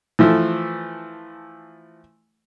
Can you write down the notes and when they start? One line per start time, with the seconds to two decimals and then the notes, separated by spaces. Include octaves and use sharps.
0.19 E3 F3 A3